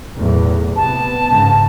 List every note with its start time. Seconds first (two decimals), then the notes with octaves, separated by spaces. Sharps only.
0.16 B1 E2 A2
0.76 C3 B3 A5
1.27 G#1 G#2 C#3